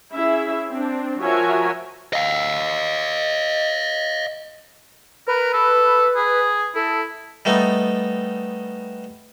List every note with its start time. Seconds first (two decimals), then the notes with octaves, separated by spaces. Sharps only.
0.12 C#4 E4 G#4 E5
0.71 C4 D4
1.21 F3 F#4 A#4 C#5 E5 G#5
2.13 D#5 F5
5.28 A#4 B4
5.53 A4
6.16 G#4
6.75 E4 A4
7.45 G3 A3 B3 D#4